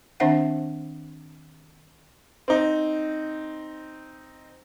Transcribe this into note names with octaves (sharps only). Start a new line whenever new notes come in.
D#3 C4 D4 C5 E5 F#5
C4 D#4